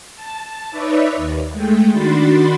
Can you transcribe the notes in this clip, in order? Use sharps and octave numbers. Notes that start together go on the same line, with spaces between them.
A5
D#4 B4 C#5 D5 E5
D#2
G#3 A3 G5
D#3 D4 F#4 B5 C6 A6